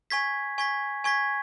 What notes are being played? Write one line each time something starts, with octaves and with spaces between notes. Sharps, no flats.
G#5 C#6 G#6 B6
G#5 C#6 G#6 B6
G#5 C#6 G#6 B6